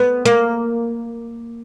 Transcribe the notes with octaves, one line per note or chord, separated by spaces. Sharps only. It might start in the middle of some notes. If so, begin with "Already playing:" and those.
Already playing: B3
A#3